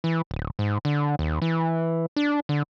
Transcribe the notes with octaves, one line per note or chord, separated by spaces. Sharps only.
E3
D1
G#2
D3
D#2
E3
D4
D3